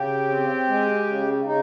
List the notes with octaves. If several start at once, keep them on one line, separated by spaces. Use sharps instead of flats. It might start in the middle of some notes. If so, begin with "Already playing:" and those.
Already playing: C#3 G4
C4
G#3
C#3
C#3 D#4